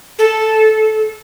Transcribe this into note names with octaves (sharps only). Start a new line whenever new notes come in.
A4